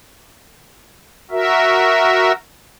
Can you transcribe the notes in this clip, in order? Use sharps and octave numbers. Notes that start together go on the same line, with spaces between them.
F#4 A#4 E5